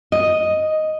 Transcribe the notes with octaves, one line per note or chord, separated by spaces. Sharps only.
D#5